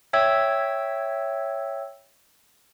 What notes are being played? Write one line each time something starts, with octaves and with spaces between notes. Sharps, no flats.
C#5 E5 G5 E6 G#6